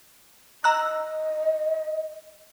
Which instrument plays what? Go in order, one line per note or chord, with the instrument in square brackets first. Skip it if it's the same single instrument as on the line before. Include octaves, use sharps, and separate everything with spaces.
[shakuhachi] D#5 [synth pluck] A#5 E6 F#6